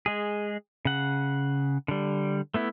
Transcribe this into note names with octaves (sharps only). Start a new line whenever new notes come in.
G#3 G#4
C#3 F#5
D3 G3
A3 B3 E4